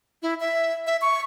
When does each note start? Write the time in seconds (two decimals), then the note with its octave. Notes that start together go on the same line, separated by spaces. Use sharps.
0.22 E4
0.40 E5
0.87 E5
1.02 C#6